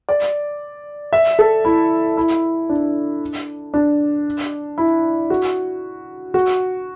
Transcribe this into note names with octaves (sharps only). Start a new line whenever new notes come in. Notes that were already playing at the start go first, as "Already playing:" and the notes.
D5
E5
A4
E4
E4
D4
D4
E4
F#4
F#4